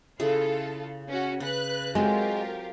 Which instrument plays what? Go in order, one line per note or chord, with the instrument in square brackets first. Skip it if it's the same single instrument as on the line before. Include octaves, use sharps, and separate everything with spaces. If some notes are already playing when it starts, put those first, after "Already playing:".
[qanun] C#3 E4 G#4 [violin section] F4 A4
[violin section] C#4 F#4
[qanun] C#3 [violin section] B4 F#6
[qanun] F#3 C4 A4 [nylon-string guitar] G#3 [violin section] F4 G4 A#4